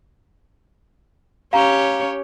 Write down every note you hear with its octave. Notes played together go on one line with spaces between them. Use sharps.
C#4 G4 C#5 F5 A#5